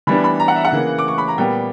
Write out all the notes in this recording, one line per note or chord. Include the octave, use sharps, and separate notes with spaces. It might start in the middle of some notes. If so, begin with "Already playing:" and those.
E3 G3 B3 D4 B5
B5
A#5
F#5
E5
F#5
C#3 E3 A#3
D6
C#6
B5
A#5
A#2 G3 B3 G5